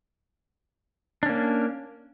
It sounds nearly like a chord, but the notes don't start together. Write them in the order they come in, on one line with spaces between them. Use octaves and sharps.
D4 C#4 A#3